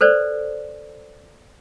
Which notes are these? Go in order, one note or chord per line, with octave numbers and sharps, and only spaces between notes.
A4 B4 C5 D5